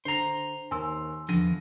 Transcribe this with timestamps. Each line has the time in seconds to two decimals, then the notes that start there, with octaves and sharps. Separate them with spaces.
0.05 D3 C5 A#5 C7
0.71 D#2 G#5 C6 E6
1.29 E2 D3 F3 A#6 D#7